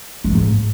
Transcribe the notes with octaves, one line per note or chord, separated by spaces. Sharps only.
G#3
D#3
G#2